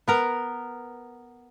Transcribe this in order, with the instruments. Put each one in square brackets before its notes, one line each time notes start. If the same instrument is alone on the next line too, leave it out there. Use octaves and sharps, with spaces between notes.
[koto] B3 A#4 A#5